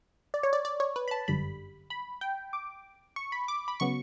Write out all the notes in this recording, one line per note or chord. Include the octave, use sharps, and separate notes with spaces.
D5
C#5
D5
D5
C#5
B4
B5
A5
G1 F#2 D3 G3 B5
B5
G5
D6
C#6
B5
D6
B5
C#3 F#3 B3 C#6